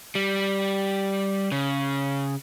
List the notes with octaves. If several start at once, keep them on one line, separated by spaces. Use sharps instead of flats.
G3
C#3